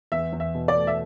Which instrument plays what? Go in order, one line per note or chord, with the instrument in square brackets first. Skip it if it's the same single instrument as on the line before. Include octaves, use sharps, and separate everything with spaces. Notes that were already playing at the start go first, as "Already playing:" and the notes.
[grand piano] E2 [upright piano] E5
[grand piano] E2
[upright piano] E5
[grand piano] B2
[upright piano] D5
[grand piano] A3
[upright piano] E5